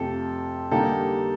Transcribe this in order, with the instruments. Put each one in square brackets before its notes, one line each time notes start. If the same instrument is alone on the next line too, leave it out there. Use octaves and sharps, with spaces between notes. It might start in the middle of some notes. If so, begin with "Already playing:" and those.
Already playing: [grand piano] F2 C3 F3 A3 G4 A4
D3 G3 A#3 D#4 G4 A4